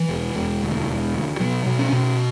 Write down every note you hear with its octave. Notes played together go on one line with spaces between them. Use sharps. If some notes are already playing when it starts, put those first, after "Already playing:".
Already playing: E3
E1
E1
D2
E1
D2
B2 F#3
B2
C#4
B2